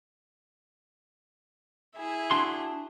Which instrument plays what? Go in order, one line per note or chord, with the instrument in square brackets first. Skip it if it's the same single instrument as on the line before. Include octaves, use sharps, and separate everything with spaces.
[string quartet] E4 G#4 E5
[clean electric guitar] D4 F#4 C6